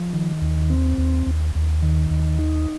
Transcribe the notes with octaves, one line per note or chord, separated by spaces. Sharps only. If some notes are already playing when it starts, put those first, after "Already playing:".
Already playing: F3
D#3
D#2
C4
D#2
D#2
D#2
D#3
D#2
D#4